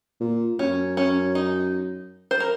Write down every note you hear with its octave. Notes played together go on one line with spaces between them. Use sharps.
A#2
F#2 C#4
C#4
D#4
C5
A#4